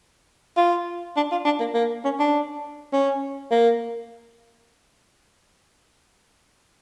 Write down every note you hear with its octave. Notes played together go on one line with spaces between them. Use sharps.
F4
D4
F4
D4
A#3
A#3
C#4
D4
C#4
A#3